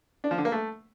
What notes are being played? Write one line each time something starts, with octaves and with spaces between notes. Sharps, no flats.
D4
F3
D3
A#3
A3